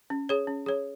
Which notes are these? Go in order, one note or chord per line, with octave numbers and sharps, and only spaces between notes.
C#4
G#4 C#5
C#4
G#4 C#5